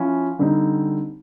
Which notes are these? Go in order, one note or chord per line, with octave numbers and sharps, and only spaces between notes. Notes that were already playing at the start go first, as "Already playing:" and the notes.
Already playing: F3 C#4 E4
D3 G3 C4 D#4